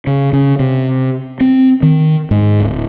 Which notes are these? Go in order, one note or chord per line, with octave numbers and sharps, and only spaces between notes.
C#3
C#3
C3
C4
D#3
G#2
D1